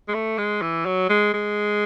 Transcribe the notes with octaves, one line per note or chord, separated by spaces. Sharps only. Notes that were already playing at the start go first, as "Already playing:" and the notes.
G#3
A3
G#3
E3
F#3
G#3
G#3